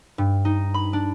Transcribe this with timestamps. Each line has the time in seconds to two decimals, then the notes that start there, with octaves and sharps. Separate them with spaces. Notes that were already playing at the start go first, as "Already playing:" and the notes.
0.18 G2
0.45 D#4
0.74 B5
0.93 D4